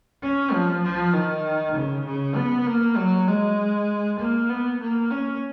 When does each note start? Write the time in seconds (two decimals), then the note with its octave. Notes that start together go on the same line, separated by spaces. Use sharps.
0.22 C#4
0.53 F3
0.83 F3
1.13 D#3
1.75 C#3
2.05 C#3
2.36 B3
2.67 A#3
2.97 F#3
3.28 G#3
4.19 A#3
4.49 B3
4.80 A#3
5.11 C#4